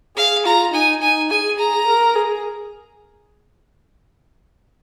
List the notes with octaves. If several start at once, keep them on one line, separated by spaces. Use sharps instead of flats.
G#4 F5
F4 A#5
D#4 G#5
D#4 G#5
G#4 G#5
A#5
A#4
G#4